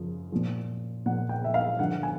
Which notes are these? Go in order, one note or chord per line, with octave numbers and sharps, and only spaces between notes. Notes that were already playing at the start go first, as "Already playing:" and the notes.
Already playing: F#2 C#3 F3
A#2 F3
A#2 F3 F#5
G5
E5
F5
G2 D3 F3 F#5
G#5